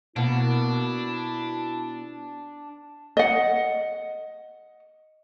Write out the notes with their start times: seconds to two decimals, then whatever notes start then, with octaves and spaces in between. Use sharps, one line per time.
0.16 B2 A#3 D4 E4
3.17 D#5 F#5